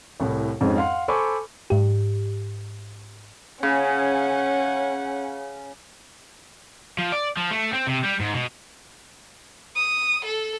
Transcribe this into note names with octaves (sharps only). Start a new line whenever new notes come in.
C2 A2
F2 G#2 G#3 C4 C#4
F5 F#5 C6
A4 C5 G#5 B5 C#6 D6
G#2 G4
C#3 C#4 F#5
F3
D5
F3
A3
C4
C3
G3
G#2
B2
D#6
A4